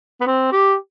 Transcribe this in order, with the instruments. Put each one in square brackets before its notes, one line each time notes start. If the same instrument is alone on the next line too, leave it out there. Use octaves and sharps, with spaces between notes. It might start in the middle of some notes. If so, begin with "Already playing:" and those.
[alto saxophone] B3
C4
G4